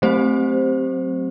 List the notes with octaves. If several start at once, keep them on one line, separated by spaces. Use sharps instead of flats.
F#3 A3 C4 G4 C5